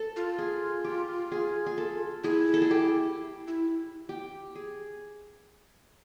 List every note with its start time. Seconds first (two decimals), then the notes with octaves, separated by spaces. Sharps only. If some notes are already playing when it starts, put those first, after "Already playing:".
Already playing: A4
0.16 F4
0.38 G#4
0.84 G4
1.32 G#4
1.66 G#4
1.78 A4
2.23 E4 G#4
2.54 A4
2.62 G#4
2.71 G4
3.47 E4
4.09 G4
4.55 G#4